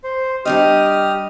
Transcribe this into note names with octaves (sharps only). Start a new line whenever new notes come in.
C5
G3 D4 G4 D#5 D#6 F6